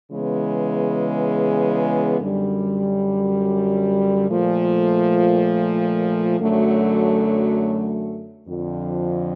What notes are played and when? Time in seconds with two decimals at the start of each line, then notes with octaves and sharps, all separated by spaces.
0.10 C#3 E3 G#3 B3
2.19 F#2 D3 G3
4.30 A#2 F3 A3
6.39 F#2 D3 F#3 A3
8.48 F2 D3 F3